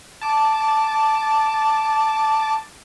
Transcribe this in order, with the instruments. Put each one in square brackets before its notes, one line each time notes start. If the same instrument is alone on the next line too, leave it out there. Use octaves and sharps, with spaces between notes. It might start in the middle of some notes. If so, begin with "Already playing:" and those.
[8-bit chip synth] A5 D6